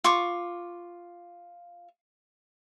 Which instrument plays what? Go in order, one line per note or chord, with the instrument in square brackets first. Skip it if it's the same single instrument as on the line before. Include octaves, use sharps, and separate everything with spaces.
[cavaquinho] F4 C#6 D6